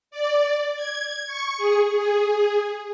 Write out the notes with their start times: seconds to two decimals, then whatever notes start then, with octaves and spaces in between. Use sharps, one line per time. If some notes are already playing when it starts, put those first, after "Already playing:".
0.11 D5
0.76 G#6
1.27 C#6
1.57 G#4
1.92 G#4